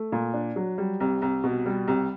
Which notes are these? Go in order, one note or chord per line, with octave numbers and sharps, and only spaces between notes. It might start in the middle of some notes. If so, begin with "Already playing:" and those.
Already playing: A3
A#2
D4
F#3
G3
C2
C2
B2
G3
C2